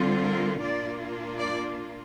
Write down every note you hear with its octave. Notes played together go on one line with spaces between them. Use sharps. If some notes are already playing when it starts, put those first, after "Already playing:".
Already playing: D3 G3 C4 F4
A#4
A#2 A#3 D4 F4 D5
D5